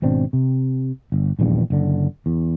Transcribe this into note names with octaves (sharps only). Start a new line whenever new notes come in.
G#1 B2 C4 D4
C3
G1
D#1 A#1 E2 G2
F#1 D3
E2